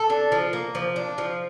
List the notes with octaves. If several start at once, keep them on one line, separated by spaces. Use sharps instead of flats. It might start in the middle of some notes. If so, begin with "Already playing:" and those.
Already playing: A4
D4
F3
A#3
F3
D4
F3